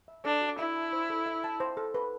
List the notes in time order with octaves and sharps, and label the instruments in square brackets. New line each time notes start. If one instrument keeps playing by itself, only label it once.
[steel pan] E5
[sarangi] D4 [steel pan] A4
[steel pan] F#4
[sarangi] E4 [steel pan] E5
[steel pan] A5
C5
A4
E5
A5
C5
A4
B4